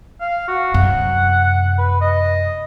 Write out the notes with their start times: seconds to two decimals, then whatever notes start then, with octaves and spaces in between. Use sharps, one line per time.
0.20 F5
0.48 F#4
0.74 F#2 C3 F#5
1.78 B4
2.01 D#5